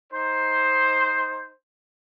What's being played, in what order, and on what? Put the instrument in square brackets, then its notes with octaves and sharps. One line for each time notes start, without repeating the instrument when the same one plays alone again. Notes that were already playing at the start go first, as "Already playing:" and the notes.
[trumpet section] D#4 C5